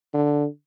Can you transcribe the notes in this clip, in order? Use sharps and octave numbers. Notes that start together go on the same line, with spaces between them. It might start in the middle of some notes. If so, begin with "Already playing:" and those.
D3